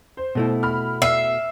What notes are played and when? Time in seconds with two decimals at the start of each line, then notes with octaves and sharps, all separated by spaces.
0.17 C5
0.35 B2 A3 E4
0.63 B5 F6
1.02 E5 C7